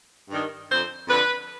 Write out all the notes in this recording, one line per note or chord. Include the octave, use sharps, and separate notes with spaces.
G2 D#3
F2 D3 C5
F2 D3 B4